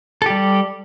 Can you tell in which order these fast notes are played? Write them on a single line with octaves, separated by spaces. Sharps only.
A4 G4 G3